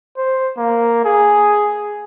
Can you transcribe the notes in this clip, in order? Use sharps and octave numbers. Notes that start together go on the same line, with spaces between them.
C5
A#3
G#4